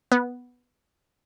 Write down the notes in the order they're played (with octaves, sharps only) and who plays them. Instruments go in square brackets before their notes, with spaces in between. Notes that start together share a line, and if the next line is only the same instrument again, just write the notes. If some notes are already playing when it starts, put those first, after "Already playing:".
[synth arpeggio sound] B3